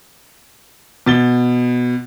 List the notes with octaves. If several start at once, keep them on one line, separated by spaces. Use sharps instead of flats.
B2 A6 G7